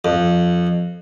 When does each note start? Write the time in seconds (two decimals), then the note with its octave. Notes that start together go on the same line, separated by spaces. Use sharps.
0.05 F2